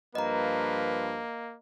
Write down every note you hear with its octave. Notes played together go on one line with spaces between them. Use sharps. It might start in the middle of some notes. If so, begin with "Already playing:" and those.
G2 F3 A#3 B4 D#5 A#5